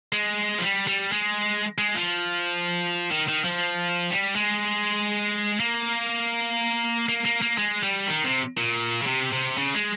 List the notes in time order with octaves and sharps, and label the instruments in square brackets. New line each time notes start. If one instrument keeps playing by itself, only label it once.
[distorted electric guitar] G#3
F3
G3
G3
G#3
G#3
F3
D#3
D#3
F3
G3
G#3
A#3
A#3
A#3
A#3
G#3
G3
D#3
C3
A#2
C#3
C3
C3
C#3
G#3